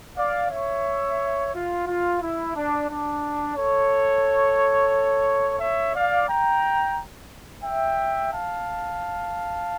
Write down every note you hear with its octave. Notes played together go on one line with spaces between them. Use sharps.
D5 F5
C#5 E5
F4
F4
E4
D4
D4
A4 C#5
C#5 E5
D5 F5
G5 A#5
E5 G5
F5 A5